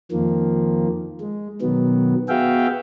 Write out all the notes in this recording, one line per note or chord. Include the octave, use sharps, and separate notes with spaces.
F2 D#3 F3 A#3
G#3
B2 D#3 F#3 B3
B3 F#4 G#4 E5 F5 G5